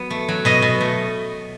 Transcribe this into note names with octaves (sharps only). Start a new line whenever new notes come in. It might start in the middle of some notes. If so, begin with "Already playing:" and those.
Already playing: F#3 B3
A3
F#3
B2 D#5
B2
A3